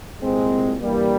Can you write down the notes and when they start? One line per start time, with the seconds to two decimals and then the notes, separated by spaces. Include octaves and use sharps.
0.21 C2 A#2 G#3 C4
0.81 G2 E3 G3 A#3